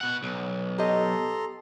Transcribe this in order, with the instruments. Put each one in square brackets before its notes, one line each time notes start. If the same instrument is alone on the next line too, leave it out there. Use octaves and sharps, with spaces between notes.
[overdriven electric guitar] B2 F#5
B1
[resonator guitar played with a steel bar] G4 D#5 [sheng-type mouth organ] A4 A#5 C6